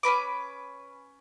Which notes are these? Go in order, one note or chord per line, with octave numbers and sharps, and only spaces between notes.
C#4 D#4 B4 D6